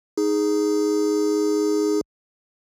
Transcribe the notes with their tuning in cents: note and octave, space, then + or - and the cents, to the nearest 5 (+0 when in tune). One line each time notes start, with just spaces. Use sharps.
D#4 +0 G#4 +0